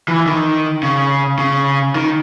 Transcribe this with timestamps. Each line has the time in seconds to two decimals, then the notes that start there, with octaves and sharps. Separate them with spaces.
0.08 E3
0.27 D#3
0.83 C#3
1.39 C#3
1.95 D#3